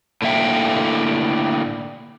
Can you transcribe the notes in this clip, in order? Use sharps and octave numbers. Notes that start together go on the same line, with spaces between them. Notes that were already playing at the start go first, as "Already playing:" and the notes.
A2 D3 A#3 E5 G5